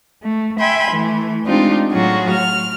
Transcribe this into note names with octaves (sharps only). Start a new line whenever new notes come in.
A3
E5 G5 G#5 B5 C6
E3 A3
G#3 C4 D4 D#4 F4 G4
A2 F#3 F4 F#4 G#4
F6